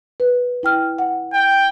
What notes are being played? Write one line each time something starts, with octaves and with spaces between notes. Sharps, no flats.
B4
E4 G5 F6
F#5
G5